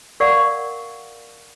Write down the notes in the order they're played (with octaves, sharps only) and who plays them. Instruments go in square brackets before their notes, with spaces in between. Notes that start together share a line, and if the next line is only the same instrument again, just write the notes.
[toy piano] A#4 D5 F5 F#5 C#6